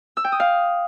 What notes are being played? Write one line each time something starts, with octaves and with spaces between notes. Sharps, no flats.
E6
G5
D#6
F5